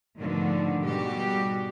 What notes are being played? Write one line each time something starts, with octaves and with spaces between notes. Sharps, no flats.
G#2 B2 D3 D#3 F3 A3
G#2 B2 G3 G#3 F#4 G4